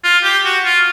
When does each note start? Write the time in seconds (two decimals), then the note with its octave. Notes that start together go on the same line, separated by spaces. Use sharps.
0.04 F4
0.24 G4
0.45 F#4
0.64 F4